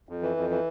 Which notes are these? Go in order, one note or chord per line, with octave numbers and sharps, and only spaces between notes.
F2
E3
F2
E3